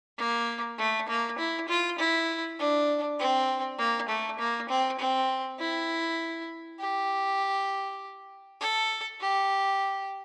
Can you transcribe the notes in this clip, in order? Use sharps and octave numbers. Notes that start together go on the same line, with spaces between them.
A#3
A3
A#3
E4
F4
E4
D4
C4
A#3
A3
A#3
C4
C4
E4
G4
A4
G4